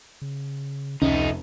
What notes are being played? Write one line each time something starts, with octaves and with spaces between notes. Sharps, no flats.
C#3
F1 C#2 A3 C#4 D#4